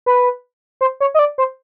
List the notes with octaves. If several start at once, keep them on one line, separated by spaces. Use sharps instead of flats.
B4
C5
C#5
D#5
D5
C5